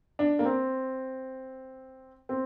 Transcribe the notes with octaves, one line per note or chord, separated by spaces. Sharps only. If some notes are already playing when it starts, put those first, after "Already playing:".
D4
A#3
C4
C4